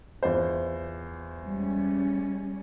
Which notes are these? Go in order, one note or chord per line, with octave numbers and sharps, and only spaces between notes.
E2 F4 C5
G3 G#3 C#4